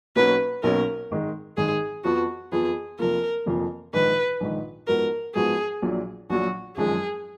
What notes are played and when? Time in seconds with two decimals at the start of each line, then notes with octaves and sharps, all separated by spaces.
0.16 B1 B2 A#3 C#4 F#4 B4
0.63 B1 B2 A#3 C#4 F#4 A#4
1.11 G#1 G#2 D#3 G#3
1.57 G#1 G#2 D#3 G#3 G#4
2.04 F2 F3 B3 F4 F#4
2.52 F2 F3 B3 F4 G#4
2.99 F1 F2 F3 A#3 F4 A#4
3.46 F1 F2 F3 A#3 F4
3.93 A#1 G#2 D#3 B4
4.40 A#1 G#2 D#3
4.87 G#2 F3 B3 F#4 A#4
5.35 G#2 F3 B3 F#4 G#4
5.82 A#1 A#2 F#3
6.30 A#1 A#2 F#3 F#4
6.77 G#1 F#2 F3 G#3 G#4